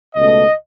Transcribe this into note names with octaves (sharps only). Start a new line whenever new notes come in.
C#2 B2 A3 C#4 D#5